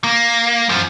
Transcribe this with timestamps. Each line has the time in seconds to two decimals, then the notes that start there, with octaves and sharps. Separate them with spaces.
0.04 A#3
0.69 F#2 F3